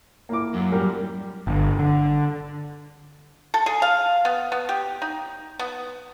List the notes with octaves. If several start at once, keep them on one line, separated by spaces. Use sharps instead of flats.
A#3 E4 D6
F#2
G3 A#4
G1
D3
A4
G#4
F5
B3
B3
G4
D#4
B3